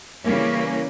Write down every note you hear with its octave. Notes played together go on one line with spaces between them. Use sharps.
C#3 E3 G3 A#3 C#4